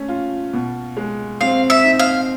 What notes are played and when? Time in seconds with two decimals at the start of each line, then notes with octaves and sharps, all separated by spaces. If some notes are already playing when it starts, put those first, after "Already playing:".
Already playing: A3 C#4
0.09 F4
0.53 B2
0.97 G#3
1.41 C4 F5
1.70 E5
1.84 D#4
1.99 F5